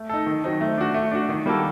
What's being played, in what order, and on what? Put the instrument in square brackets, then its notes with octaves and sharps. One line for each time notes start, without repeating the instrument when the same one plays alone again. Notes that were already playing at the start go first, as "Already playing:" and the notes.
Already playing: [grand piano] A3
D#4 A4
D#3
F#3 C4 D#4
A3
D4 F#4
A3
D4 F#4
D#3
G3 A#3 F#4 A4